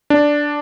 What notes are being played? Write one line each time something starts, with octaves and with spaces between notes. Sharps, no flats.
D4